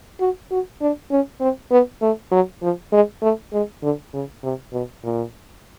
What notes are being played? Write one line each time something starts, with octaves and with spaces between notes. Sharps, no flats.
F#4
F#4
D4
C#4
C4
B3
A3
F#3
F3
G#3
A3
G#3
D3
C#3
C3
B2
A#2